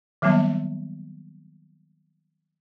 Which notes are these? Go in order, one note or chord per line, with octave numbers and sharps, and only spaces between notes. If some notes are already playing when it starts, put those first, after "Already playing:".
D#3 F#3 G3 A#3 B3